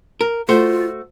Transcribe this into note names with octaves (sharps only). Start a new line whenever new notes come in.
A#4
A3 F4 F#4 C5